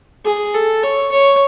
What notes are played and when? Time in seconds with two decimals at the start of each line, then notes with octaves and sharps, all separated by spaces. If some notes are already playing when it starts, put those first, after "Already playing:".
0.25 G#4
0.54 A4
0.83 C#5
1.11 C#5